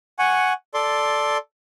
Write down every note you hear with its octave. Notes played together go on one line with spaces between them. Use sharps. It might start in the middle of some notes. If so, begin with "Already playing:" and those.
F#5 G#5 C#6
A4 D5 C6